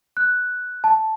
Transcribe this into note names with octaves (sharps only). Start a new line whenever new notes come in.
F#6
A5